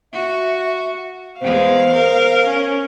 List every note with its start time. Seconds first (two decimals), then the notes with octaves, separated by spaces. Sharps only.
0.13 F#4 E5
1.41 E2 G#3 C5 F5
1.93 A#4
2.47 C#4 G#5